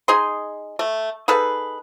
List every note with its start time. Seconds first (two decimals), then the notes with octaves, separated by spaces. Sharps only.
0.08 D#4 G#4 D#5 C6
0.79 A3
1.28 D#4 G#4 A4 B4